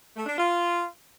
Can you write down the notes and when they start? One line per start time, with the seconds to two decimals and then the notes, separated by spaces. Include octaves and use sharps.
0.15 A3
0.26 D4
0.37 F4